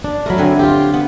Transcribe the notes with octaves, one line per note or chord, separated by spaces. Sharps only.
D4
F#3 A3 A#4 E5 B5
D3 C4 G#5
F4 G4
B3